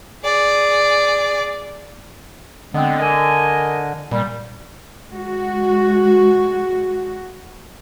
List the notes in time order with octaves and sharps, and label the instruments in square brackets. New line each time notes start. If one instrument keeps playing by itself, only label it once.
[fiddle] G#4 D5
[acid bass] D3 [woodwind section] G#3 B3 C4
[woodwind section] A#4 D#5 G#5
[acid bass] A#2 [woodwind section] G3
[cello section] G#3 F#4